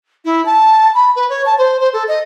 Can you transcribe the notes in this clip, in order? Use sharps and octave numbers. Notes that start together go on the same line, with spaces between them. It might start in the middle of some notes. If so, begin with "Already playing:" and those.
E4
A5
B5
B4
C#5
A5
C5
C5
A4
D#5